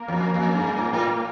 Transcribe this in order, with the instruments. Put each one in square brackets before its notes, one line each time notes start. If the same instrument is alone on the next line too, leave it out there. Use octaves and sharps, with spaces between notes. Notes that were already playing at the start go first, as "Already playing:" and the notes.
Already playing: [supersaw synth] A#3 A#4
[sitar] E2
F2
F2
G2
A2
A2